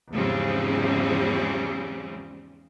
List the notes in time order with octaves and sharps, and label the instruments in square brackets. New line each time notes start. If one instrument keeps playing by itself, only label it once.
[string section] E2 G#2 C#3 F3 G3 C4